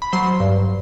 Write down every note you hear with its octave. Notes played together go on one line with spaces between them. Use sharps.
B5
F#3 C5 C6
G2